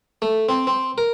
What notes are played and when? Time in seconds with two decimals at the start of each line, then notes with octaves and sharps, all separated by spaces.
0.22 A3
0.49 C4
0.67 C4
0.98 A#4